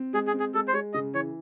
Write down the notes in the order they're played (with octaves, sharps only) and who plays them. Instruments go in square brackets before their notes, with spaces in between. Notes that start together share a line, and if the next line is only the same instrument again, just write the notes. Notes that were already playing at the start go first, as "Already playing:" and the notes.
Already playing: [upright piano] C4
[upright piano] G#3 [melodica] G#4
[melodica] G#4
[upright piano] C4
[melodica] G#4
[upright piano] G#3 [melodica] A4
[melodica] C5
[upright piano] G#3 [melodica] C#5
[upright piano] C#3 [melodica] D#5
[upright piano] E3 [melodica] C#5